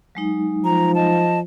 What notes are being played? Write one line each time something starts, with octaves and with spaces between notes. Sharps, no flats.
F#3 G#3 D#4
F3 A#5
D#5 A5